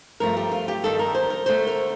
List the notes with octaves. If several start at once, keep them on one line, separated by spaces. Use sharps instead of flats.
G2 F3 A3 A#4
G4
F4
G4
G2 D#3 G3 A4
A#4
C5
A#4
D2 D3 A3 C5
A#4